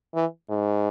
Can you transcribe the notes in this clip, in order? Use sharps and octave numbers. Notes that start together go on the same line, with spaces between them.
E3
G#2